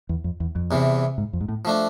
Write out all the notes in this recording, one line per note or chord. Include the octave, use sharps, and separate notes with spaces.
E2
F2
E2
F2
E2 C3 E3
G#2
F2
G#2
A2
F3 A3 D4